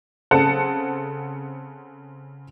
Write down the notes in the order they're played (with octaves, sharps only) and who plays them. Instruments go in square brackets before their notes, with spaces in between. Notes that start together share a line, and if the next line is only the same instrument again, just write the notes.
[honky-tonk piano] C#3 C4 A4 F#5 A5